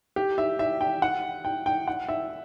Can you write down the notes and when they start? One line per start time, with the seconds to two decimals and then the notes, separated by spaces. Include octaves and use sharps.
0.16 G4
0.38 E5
0.59 E5
0.81 G5
1.02 F#5
1.45 G5
1.66 G5
1.88 F#5
2.09 E5